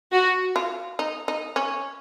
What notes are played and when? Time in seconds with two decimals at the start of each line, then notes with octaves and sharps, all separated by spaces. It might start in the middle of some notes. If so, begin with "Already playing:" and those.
0.13 F#4
0.56 F4
0.99 D#4
1.28 D#4
1.56 C#4